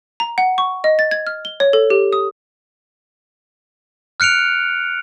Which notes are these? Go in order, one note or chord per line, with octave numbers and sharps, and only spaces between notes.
A#5
F#5
C#6
D#5
A6
G#6
F6
G7
C#5
A4
G4
D#6
F6 F#6 C#7 D7 F7